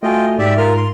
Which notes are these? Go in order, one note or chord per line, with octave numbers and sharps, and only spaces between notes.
A3 F4 F#4 D#5 G5 G#5
G#2 G4 D5 E5
F4 A#4 F6
C6